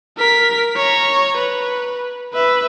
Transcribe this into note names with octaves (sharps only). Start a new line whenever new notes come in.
A#4 B6
C#5 A#5
B4
B4 E5